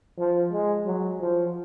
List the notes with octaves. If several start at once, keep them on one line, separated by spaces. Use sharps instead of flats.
F3
G#3
F#3
F3